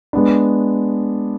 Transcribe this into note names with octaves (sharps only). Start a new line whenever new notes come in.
G#3 B3 D4